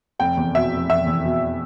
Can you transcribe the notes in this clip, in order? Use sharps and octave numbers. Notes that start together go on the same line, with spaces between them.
F1 G5
E2
B2 E5
F1
F1 E5
E2
B2